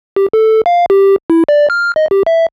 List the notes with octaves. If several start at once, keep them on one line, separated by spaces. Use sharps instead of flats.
G4
A4
F5
G4
E4
D5
F6
D#5
G4
E5